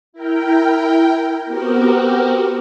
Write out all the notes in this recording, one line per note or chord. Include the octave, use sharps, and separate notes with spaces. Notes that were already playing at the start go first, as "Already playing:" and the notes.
E4 A#4 G5
B3 C4 F#4 G4 A#4